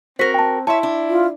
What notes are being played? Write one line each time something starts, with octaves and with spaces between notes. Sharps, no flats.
C4 F#4 A#4 C5 B6
G5 A5
E4 C#5 E5 A5 C6
D4
F4